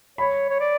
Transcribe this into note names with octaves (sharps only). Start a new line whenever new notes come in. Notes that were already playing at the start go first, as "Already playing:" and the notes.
C#5 B5
C#5
D5